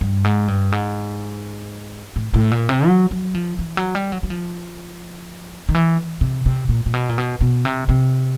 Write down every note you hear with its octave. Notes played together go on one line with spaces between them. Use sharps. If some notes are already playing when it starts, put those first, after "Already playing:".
G2
G#2
G2
G#2
A2
A2
A#2
C3
F#3
F#3
F3
E3
F#3
G3
F#3
F#3
F3
D#3
E3
C3
C3
A#2
A#2
B2
A#2
B2
B2
C3
C3